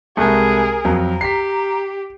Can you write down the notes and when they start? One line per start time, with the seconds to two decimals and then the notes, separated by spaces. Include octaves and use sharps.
0.17 C2 G#3 A3 G#4 A#4
0.85 F2 F#3 A#5
1.21 G4 B6 C7